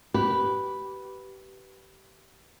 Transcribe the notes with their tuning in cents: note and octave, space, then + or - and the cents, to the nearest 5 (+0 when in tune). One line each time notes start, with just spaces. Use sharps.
G4 -25 B4 +0